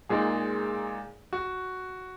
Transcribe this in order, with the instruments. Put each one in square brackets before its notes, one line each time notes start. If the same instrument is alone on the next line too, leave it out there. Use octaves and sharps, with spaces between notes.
[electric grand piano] A#2 G#3 D#4 A#4 [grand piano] G#4
[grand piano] F#4